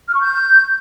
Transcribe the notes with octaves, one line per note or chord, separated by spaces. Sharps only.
F6
C#6
G6